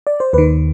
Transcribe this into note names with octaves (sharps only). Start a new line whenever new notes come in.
D5
C5
D#2 D#3 B4